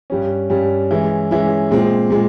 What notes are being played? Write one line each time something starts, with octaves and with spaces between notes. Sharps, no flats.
G2 G3 C#4
G2 G3 C#4
E3 G#3 C#4 E4
E3 G#3 C#4 E4
A#2 G#3 C4
A#2 G#3